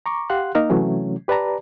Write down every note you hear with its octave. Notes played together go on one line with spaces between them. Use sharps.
A#5 C#6 D6
G4 F5 F#5 C6 F#6
A#3 D#4 A#4 F6
C3 E3 F#3 A3 C#4
G4 B4 D5 A5 A#5